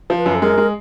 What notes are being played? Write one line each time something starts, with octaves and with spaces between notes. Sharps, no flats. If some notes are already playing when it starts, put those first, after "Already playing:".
F3
B4
F#2
A4
G#3 A#4
G#3